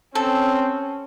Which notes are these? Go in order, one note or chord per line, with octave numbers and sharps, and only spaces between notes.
C4 C#4 A4